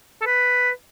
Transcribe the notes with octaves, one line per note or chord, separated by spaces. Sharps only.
A4
B4